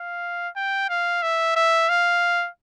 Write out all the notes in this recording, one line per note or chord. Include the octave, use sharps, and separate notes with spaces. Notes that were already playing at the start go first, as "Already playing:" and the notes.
Already playing: F5
G5
F5
E5
E5
F5